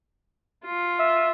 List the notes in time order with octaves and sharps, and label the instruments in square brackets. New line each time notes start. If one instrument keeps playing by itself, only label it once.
[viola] F4
[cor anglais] E5